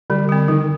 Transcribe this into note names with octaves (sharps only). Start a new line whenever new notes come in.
D3 G3
G3 C4
D#3 G3